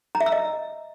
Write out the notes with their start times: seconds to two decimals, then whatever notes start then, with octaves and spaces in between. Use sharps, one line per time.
0.15 A#5
0.21 E5
0.26 E6
0.32 D#5